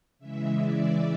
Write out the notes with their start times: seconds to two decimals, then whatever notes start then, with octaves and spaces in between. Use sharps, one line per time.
0.19 C#3 E3 G#3 E5
0.55 D5